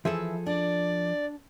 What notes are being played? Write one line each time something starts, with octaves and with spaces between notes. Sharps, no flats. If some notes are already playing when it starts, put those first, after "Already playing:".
E3 F3 G#4 A4 E5
D4 D5